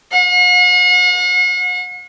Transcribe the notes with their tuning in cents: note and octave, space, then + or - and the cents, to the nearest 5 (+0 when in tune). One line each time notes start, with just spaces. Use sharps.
F#5 -45